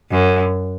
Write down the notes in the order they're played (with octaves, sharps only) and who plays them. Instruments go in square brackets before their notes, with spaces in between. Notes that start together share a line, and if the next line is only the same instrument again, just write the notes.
[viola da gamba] F#2